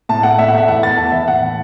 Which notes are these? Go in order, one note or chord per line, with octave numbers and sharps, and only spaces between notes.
A2 A5
A3 F#5
A2 E5
F#5
A3 E5
E2 F#5
B3 A6
E2 A5
E3 E5
A2 F#5
E3